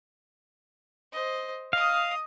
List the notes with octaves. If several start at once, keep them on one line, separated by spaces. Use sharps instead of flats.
C5 D#5
D#5 F5 D#6